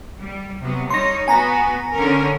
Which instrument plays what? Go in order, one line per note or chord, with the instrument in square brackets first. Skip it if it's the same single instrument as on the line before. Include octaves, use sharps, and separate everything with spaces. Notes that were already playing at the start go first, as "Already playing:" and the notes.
[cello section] G3
C3 F#3 B3
[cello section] G3 D#4 C#5 [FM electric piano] C6 A#6
[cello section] B3 F#4 [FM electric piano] G#5 A#5 A#6
[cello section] D3 C#4 A#4